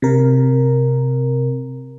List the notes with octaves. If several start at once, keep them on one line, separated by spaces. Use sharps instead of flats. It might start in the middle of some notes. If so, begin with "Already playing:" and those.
C3 A#4